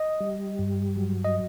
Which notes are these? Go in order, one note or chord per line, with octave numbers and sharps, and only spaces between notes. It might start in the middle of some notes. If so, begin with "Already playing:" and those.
Already playing: D#5
G3
G2
F#3
D#5